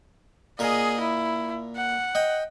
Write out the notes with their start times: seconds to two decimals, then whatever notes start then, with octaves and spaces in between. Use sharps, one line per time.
0.59 A#2 G#4 A#4 D#5
1.00 E4
1.76 F#5
2.15 D#5 G5